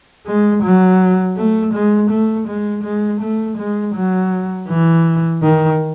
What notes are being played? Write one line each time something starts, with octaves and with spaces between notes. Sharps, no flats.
G#3
F#3
A3
G#3
A3
G#3
G#3
A3
G#3
F#3
E3
D#3